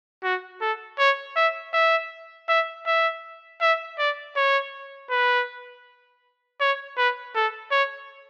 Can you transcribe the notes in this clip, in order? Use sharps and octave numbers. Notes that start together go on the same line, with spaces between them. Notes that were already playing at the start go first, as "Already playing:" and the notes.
F#4
A4
C#5
E5
E5
E5
E5
E5
D5
C#5
B4
C#5
B4
A4
C#5